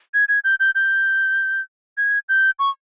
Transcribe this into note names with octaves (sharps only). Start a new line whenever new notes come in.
G#6
G#6
G6
G6
G6
G#6
G6
C#6